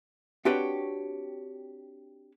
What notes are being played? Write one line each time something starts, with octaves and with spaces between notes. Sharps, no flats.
C4 D4 F#4 G4 B4 C#5